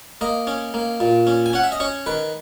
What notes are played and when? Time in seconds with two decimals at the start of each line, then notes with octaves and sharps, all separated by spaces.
0.21 A#3 D#5
0.47 C#4
0.74 A#3
1.00 A#2
1.27 C#4
1.46 G#5
1.53 C#4 F#5
1.64 E5
1.72 D#5
1.80 C#4 C#5
2.06 D#3 B4